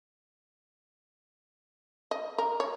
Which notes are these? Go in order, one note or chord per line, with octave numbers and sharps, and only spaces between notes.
D#5
A#4
C#5